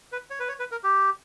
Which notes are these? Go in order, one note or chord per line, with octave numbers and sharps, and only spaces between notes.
B4
C#5
B4
C#5
B4
A#4
G4